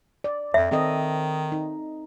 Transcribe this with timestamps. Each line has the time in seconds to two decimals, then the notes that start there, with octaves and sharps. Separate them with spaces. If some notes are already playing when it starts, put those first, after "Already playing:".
0.24 D5
0.54 F2 E5
0.71 D#3 C4 A4 D#5
1.52 D#4